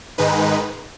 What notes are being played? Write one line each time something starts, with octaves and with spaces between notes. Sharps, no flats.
G#2 D#3 G#3 D#4 B4